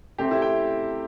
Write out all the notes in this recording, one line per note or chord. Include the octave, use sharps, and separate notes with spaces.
C3 A3 C4 G4
E4
G5